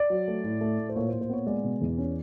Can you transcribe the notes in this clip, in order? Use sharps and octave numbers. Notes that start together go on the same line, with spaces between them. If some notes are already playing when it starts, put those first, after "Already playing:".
Already playing: D5
F#3
A3
A2
A3
A2
C5
A#2 C#5
C5
A#2
C5
B3 C#5
G#3 D5
B2
E2
C#4